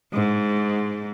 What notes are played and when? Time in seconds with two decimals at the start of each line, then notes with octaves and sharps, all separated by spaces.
0.14 G#2